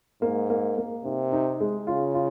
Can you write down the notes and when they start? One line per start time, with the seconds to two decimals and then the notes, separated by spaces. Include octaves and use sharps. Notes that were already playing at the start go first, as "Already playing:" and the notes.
0.22 G#2 A#3
0.50 A#3
0.78 A#3
1.05 C3 D#4
1.32 D#4
1.60 G#3
1.87 C#3 F4
2.15 F4